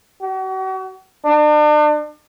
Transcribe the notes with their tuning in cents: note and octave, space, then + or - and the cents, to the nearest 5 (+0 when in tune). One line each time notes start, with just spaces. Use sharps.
F#4 +40
D4 +40